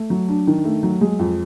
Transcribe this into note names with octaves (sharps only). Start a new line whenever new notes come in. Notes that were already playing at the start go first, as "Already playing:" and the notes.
Already playing: A3
F#3
D4
D#3
A3
F#3
G#3
F2